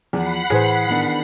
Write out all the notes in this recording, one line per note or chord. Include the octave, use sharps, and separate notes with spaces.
E2 F3 F#5 B5 C7
A2 E3 G#4 B4 C5
D#3 B3 D4